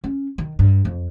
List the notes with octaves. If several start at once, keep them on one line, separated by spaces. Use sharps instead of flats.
C#4
D#3
G2
F2